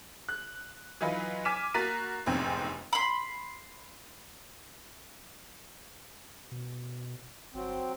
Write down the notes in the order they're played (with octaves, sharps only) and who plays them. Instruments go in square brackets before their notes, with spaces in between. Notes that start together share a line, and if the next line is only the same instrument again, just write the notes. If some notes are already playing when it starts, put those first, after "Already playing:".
[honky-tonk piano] F#6
E3 F#3 D#4 F4 B4
G#5 D6 F6 B6 E7
A#3 F#4 A#5 A6 B6 D#7
F1 A#1 E2 G#2 C4 G5
[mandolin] B5 C6
[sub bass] B2
[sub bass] G1 [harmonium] F#3 C4